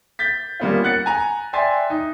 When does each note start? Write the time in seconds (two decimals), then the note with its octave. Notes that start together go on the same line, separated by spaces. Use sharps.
0.19 G6 A6 B6
0.60 G3 A#3 B3 C#4 F4
0.84 F#5 F#6 A6 C#7
1.06 G#5 A#5
1.53 D5 E5 G5 G#5 C6 A6
1.90 D#4